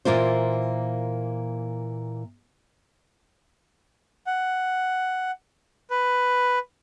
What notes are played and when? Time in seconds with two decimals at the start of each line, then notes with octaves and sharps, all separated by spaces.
0.05 A#2 E3 A#3 F4 C5
4.27 F#5
5.91 B4